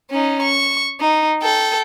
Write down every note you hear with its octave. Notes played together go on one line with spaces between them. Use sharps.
C#4 D#4
C#6
D#4
A4 G5